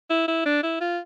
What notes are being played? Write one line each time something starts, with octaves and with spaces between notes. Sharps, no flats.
E4
E4
D4
E4
F4